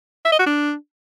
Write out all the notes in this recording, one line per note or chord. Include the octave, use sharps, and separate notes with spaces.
E5
D#5
F#4
D4